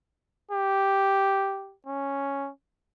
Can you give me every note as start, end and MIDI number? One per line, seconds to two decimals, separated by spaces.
0.51 1.75 67
1.86 2.50 61